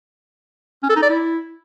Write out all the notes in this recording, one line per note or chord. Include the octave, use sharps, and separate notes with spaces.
C#4
A4
D#4
D5
E4